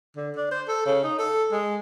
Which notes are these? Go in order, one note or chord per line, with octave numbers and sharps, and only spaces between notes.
D3
D4
C5
A4
C#3
D#4
A4
G#3